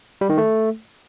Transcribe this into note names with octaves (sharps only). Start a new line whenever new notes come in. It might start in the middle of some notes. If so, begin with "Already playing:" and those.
G3
D#3
A3